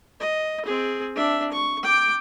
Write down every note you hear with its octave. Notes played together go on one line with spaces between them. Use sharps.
D#5
C4 G#4
D4 E5
C#6
G5 D6